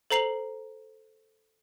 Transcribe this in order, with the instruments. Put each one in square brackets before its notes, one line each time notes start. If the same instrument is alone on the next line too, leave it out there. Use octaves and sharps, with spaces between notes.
[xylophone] A4 C5 A#5 C7 F7 F#7